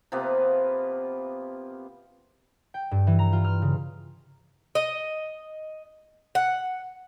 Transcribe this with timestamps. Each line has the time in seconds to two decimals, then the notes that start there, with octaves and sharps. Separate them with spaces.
0.12 C3 F3 A#3 B3
2.74 G5
2.91 G2
3.07 E3
3.19 A#5
3.33 F4
3.44 F6
3.62 C#3
4.75 D#5
6.35 F#5